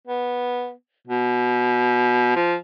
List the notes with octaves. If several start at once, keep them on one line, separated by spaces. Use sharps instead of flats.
B3
B2
F3